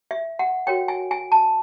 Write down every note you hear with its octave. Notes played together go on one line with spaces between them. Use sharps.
E5
F#5
F#4 A#4 C#5 G5
G#5
G#5
A5